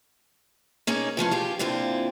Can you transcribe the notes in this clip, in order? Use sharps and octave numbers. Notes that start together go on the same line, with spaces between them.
A#3 C#4 D#4 G#4
E3 F3 A3 C#4
F4 G4 G#4
A#2 D3 C4 E4 F4